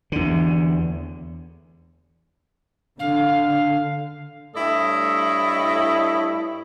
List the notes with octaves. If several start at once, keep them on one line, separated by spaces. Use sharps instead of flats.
E2 D3
D3 F5
G2 A3 E4 A4 C#5 D#5